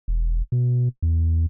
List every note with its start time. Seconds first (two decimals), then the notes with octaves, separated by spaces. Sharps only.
0.08 E1
0.52 B2
1.02 E2